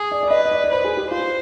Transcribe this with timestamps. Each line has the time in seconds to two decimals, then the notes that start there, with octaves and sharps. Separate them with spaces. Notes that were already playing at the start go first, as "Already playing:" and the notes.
Already playing: G#4
0.11 D5
0.23 D5
0.31 B4 D#5
0.45 D#5
0.51 D5
0.64 D5
0.71 B4 C5
0.84 G#4
0.97 G4
1.11 F4 C5